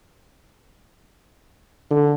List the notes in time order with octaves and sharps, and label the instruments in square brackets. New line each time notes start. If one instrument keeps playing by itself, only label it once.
[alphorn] D3